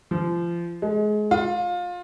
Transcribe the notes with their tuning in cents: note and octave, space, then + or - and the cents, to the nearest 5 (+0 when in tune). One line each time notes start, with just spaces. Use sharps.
F3 -30
G#3 +25
F4 +25